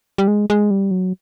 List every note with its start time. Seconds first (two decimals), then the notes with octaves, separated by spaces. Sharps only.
0.18 G3
0.28 G#3
0.50 G#3
0.71 G3
0.91 F#3